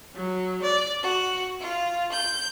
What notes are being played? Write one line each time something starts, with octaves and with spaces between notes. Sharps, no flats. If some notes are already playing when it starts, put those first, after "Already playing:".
F#3
D5
F#4
F4
G6